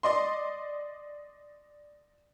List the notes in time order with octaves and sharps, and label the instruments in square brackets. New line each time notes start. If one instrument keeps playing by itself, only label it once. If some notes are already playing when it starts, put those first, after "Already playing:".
[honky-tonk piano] D5 D#5 C6